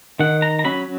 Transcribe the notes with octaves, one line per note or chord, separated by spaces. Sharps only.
D#3 F#5
A#5
A#5
F#3 C#4 B5